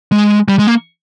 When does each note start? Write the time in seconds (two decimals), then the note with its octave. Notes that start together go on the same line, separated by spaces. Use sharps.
0.12 G#3
0.48 G3
0.59 G#3
0.67 A#3